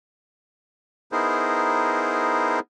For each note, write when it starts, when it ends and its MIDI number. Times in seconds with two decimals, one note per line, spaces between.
1.12 2.60 59
1.12 2.60 63
1.12 2.60 64
1.12 2.60 68
1.12 2.60 70
1.12 2.60 72